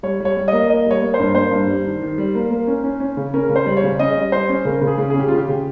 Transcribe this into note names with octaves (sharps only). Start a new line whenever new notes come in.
G3 C#5
G3 C#5
G3
A#3 D#5
A#3 D#5
G3 C#5
A#3
C5
G2
A#3 C5
G2
G3
D#3
D#3
G3
A#3
A#3
C#4
C#4
C#4
C#3
C#4 A#4
C#3
C5
G3
C#5
C#3
C#4 D#5
G3
G3 C5
C#4
C#3 A#4
C#3
G#4
C#3
G#4
C#4 G4
C#3 F4
G4
C#3